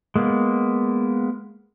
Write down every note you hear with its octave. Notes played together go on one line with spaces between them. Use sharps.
G#3 A#3 B3